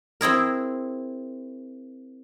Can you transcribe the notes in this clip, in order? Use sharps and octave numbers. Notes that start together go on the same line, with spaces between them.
C4 E4 G#4 A#4